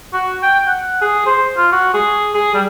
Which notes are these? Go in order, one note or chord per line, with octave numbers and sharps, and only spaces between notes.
F#4
G5
F#5
G#4
C5
F4
F#4
G#4
G#4
G3